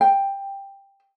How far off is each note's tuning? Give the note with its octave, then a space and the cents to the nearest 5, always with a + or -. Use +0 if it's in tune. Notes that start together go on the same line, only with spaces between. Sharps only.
G5 +10